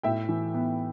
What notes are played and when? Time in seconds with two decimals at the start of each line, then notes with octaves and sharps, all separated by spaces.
0.03 A2 E5 G5
0.29 E3
0.54 B3